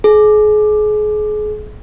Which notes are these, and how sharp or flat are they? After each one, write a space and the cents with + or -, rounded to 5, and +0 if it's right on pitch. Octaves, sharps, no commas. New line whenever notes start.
G#4 +35